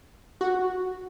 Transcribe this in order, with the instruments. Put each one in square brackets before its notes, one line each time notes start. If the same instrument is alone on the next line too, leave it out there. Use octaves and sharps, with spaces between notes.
[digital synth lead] F#4